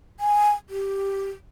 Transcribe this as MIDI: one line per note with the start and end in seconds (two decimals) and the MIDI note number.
0.20 0.51 80
0.70 1.28 67